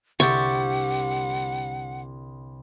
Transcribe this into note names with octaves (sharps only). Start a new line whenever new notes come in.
C2 D3 E4 G4 F#5 C#6 A6